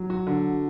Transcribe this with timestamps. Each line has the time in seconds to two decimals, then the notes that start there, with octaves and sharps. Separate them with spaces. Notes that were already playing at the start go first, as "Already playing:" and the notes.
Already playing: F#3
0.10 F#4
0.27 D3